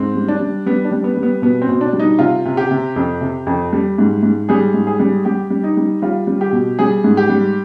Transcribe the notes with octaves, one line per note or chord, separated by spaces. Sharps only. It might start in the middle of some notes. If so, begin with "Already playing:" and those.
Already playing: G#2 C4
G3
D4
G3
G3 B3
D4
G3
B3
G3
B3
B2 B3
C4
B2
D4
G3
D#4
C3 F4
C3
G4
C3
F2
C3
F2
G3
G#2
G#2
G3 G#4
G#2
G#4
G3
G3 G4
G3
D#4
G3
G3 F4
G3
G4
B2
G3 G#4
G#2
G4
G3